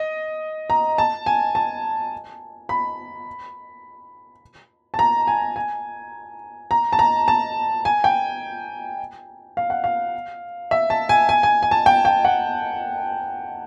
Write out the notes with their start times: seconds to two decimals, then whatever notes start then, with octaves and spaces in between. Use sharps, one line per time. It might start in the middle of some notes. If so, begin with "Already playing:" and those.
Already playing: D#5
0.70 A#5
0.98 A5
1.26 G#5
1.55 A5
2.69 B5
4.94 A5
4.99 A#5
5.27 G#5
5.56 G#5
6.71 A#5
6.93 A5
6.99 A#5
7.28 A5
7.85 G#5
8.04 G5
9.57 F5
9.70 F#5
9.84 F5
10.71 E5
10.90 A5
11.09 G#5
11.29 G#5
11.43 G#5
11.63 G#5
11.71 A5
11.86 G5
12.05 G5
12.25 F#5